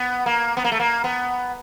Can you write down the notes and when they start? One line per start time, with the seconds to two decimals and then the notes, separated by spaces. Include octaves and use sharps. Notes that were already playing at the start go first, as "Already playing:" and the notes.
Already playing: B3
0.26 A#3
0.57 B3
0.64 A#3
0.72 A3
0.80 A#3
1.04 B3